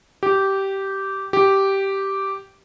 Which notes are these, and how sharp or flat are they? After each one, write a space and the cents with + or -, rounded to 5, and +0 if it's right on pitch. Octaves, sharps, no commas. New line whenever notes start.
G4 -15
G4 -10